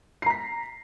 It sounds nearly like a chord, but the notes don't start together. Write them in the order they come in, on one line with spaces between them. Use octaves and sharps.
C7 A#5 B6